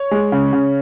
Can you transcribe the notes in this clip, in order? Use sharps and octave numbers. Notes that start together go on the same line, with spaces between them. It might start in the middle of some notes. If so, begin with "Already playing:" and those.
Already playing: C#5
G#3
C#3
C#3